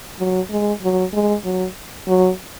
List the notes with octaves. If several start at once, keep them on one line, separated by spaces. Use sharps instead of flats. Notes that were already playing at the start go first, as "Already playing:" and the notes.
F#3
G#3
F#3
G#3
F#3
F#3